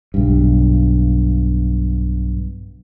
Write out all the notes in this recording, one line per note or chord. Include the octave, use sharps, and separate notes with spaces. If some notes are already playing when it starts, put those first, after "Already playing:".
B1 G2